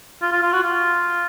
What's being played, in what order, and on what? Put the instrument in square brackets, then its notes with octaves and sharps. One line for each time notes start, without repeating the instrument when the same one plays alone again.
[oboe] F4
F4
F4
F#4
F4